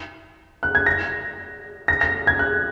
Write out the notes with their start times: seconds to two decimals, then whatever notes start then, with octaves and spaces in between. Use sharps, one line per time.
0.63 F#6
0.75 G#6
0.86 A#6
1.88 A#6
2.01 A#6
2.27 G#6
2.39 F#6